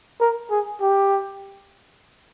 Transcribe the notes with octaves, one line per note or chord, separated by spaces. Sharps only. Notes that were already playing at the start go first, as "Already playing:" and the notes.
A#4
G#4
G4